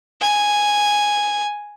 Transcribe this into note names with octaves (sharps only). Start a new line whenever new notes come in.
G#5